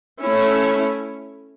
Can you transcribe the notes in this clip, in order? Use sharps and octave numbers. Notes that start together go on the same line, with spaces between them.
A3 C#4 E4